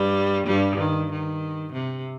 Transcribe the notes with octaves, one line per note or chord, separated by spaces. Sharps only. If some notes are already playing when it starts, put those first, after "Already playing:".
Already playing: G2 G3
G2 G3
D#3
D#3
C3